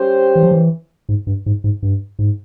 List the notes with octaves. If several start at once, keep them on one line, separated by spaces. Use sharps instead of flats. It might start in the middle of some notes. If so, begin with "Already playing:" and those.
Already playing: G3 C#4 G4 C5
E3
F3
E3
G#2
G2
G#2
G#2
G2
G#2